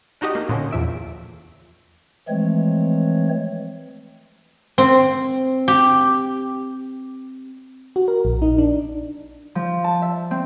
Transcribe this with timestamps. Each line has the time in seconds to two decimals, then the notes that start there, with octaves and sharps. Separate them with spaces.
0.21 D4 D#4 F#4 G4 D#5
0.35 A#3
0.49 A#2 D3 C#4
0.71 E2 F3 E5 D7
2.28 E3 F3 G#3 A3 C4 C#5
4.78 C4
5.68 G4
7.96 F#4
8.08 A#4
8.25 A#1
8.42 D#4
8.58 D4
9.55 F3
9.84 A5
10.02 E5
10.31 C4